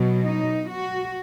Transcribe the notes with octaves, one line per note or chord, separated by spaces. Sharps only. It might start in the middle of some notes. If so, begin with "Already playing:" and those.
Already playing: B2 F#3
D#4
F#4